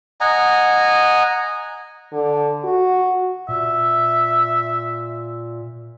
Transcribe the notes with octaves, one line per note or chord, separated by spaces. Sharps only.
D#5 F#5 G#5 A#5
D3
F#4
A#2 E5